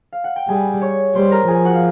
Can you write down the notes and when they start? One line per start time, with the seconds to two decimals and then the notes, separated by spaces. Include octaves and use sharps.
0.12 F5
0.24 F#5
0.36 G5
0.49 G3 G#4 G#5
0.81 C#5 C#6
1.15 G3 C5 C6
1.31 A#4 A#5
1.48 F3 G#4 G#5
1.65 F#4 F#5
1.74 F5